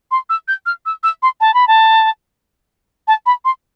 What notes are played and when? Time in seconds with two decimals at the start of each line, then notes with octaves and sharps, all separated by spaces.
0.11 C6
0.30 E6
0.48 G6
0.66 F6
0.86 E6
1.03 E6
1.23 C6
1.41 A5
1.54 B5
1.68 A5
3.08 A5
3.26 B5
3.45 C6